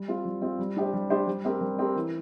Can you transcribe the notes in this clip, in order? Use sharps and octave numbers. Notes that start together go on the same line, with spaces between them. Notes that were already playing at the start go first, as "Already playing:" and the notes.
Already playing: G3
C4 F4
G3
C4 F4
G3
D4 G4 C5
G3
D4 G4 C5
G3
C4 G4 A#4
G3
C4 G4 A#4
E3